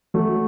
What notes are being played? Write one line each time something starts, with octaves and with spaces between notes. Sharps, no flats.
F#3 A3